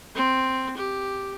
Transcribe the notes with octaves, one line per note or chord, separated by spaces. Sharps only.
C4
G4